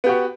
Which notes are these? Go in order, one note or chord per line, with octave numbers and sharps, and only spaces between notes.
B3 F#4 G4